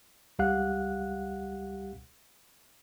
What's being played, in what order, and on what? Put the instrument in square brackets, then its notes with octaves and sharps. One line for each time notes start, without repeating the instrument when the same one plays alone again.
[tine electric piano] C#2 G3 G4 F5 F#5 F#6